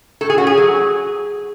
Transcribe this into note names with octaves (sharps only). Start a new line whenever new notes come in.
A2 A4
G#4
C#4 F#4
G#4
F#3